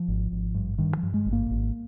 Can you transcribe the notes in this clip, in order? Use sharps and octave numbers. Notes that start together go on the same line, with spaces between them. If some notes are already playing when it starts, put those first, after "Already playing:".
Already playing: F3
G#1
G#1
G2
G2 D#3
F3
G2
G#3
G#1
A#3
G#1